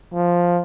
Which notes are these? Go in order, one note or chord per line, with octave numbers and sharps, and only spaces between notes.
F3